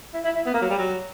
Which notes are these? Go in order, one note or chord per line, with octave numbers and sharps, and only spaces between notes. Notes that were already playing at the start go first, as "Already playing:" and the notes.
E4
E4
E4
B3
A#3
F#3
G3
F#3